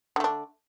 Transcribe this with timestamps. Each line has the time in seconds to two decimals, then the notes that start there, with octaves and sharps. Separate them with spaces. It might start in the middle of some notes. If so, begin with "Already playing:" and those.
0.16 D3
0.20 A3
0.24 D4